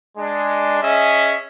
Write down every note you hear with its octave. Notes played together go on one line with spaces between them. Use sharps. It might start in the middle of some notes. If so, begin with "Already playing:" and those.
G#3 D4
C#4 G#4 D#5 E5